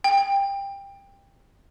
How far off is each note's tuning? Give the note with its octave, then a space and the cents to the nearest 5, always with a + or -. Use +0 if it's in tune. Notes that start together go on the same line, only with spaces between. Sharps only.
G5 +20